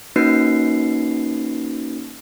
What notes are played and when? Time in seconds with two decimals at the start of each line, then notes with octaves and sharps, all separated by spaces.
0.16 A#3 C#4 D#4 F#4 B4 C7